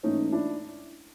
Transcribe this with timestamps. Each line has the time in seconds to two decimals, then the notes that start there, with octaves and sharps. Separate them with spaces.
0.03 G#2 E3 A3 C#4 D#4
0.32 D4 E4